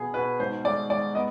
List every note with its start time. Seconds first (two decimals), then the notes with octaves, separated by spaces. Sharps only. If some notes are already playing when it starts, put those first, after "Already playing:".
Already playing: B2 B3 G#4
0.14 B2 B4
0.40 G#2 C5
0.64 G#3 D5
0.89 G#3 D5
1.15 B3 D#5